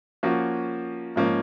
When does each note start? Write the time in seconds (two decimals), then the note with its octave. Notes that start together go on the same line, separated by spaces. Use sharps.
0.23 F3 A#3 C#4 F#4
1.16 G#2 F3 A#3 C#4